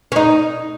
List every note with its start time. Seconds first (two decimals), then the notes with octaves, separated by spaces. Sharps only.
0.12 C#4
0.16 D#4